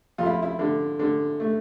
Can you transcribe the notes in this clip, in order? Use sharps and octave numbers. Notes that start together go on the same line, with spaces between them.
F2 F4
E4
E4
D3
D3
A3